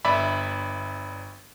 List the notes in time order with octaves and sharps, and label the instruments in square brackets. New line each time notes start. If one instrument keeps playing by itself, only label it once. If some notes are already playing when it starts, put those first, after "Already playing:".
[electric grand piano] G1 D5 E5 B5